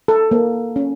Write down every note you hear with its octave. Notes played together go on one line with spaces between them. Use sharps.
A4
A#3
C#4